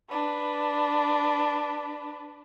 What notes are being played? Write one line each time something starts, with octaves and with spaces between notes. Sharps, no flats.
D4 B4